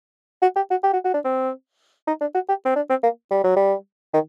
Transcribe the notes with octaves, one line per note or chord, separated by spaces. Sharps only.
F#4
G4
F#4
G4
F#4
F#4
D4
C4
D#4
D4
F#4
G4
C4
D4
C4
A#3
G3
F#3
G3
D#3